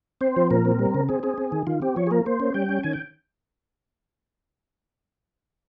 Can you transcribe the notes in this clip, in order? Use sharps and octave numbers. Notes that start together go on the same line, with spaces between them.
C4 C5
F3
A#2 A#4
C4
G3
C#3
C4 G#4
C4 G#4
C4
D#3
D#3 F4
C4 G4
F3 C#5
G#4
A#3 A#4
A#3 C5
C#4
G3 G5
C#4
D#3 G#5
G5